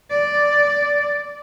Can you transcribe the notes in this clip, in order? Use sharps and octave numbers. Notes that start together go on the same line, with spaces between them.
D5